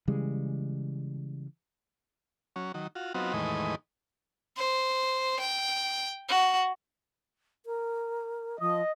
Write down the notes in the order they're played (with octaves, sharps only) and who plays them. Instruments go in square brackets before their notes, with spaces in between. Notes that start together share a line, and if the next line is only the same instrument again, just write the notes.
[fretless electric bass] C#3 E3 G3 G#3
[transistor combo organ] F#3 C#4
D#3 F#3
F4 F#4
F#3 B3 C4 D#4 F4 F#4
E2 A2 D#3 G#3 B4 D#5
[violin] C5
G5
F#4
[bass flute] A#4
[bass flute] F3 [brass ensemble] D#5